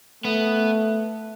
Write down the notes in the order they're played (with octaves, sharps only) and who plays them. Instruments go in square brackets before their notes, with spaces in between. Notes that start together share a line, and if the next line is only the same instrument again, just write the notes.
[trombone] A3 [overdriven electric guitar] B3